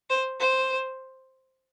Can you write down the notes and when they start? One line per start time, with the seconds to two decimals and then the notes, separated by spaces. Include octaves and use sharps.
0.10 C5
0.40 C5